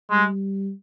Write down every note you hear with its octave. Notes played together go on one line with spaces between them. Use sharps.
G3 G#3